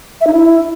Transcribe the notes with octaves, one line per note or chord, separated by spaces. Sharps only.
E5
D#4
E4